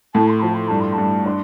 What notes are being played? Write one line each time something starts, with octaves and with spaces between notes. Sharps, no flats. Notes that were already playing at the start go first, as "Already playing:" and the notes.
A2 A5
C6
F3 A5
C6
G2 A5
C6
A5
G2
D4 C6